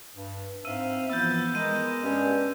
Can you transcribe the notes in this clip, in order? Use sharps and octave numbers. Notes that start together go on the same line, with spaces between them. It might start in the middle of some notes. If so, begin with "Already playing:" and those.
G2
G#2 C4 E5 F5 E6 D#7
E3 F3 B3 E6 G6 A6
G#3 B3 A#4 D#5 D#7
G2 C#4 D4